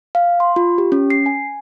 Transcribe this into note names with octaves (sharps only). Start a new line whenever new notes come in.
F5
C6
F4
G4
C#4
C7
G#5